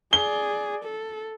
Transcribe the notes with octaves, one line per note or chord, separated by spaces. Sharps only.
G#4 D5 G7
A4